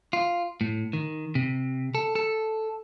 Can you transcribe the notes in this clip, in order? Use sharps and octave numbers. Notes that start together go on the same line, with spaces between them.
F4
A2
D#3
C3
A4
A4